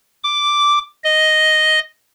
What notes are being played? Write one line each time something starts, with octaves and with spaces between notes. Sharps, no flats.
D6
D#5